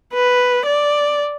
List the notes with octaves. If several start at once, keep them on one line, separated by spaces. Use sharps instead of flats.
B4
D5